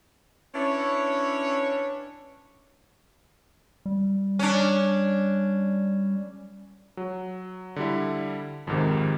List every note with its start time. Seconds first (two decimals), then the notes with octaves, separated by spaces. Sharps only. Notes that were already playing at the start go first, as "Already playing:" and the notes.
0.54 C#4 D4 E4 B4 C#5
3.86 G3
4.39 C#4 D4
6.97 F#3
7.76 D3 G3 E4
8.67 F2 G#2 C3 D#3